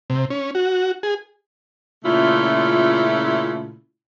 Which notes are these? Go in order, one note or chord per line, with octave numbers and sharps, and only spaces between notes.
C3
C#4
F#4
G#4
A#2 C#3 A3 C#4 E4 F4